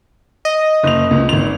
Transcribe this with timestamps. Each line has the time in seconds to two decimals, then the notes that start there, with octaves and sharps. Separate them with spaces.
0.45 D#5
0.83 F#1 F7
1.11 C#2
1.29 G#1 F7